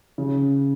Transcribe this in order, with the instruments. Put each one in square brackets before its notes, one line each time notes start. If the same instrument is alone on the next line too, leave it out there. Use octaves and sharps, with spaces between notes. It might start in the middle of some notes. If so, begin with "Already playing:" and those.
[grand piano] C#3